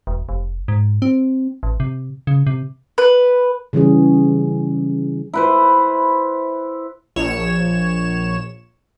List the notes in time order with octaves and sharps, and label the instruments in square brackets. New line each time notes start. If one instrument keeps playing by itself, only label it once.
[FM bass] E1
F1
G#2
C4
A1
C3
C#3
C3
[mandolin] B4
[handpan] C#3 E3 G3 C#4 G#4
[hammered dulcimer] E4 B4 C5
[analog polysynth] A#1 C#5 E7